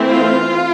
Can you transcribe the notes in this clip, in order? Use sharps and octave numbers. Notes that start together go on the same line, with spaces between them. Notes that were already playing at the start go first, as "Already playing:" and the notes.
Already playing: E3 A3 C4 E4
F4